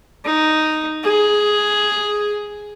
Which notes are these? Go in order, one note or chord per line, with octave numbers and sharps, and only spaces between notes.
D#4
G#4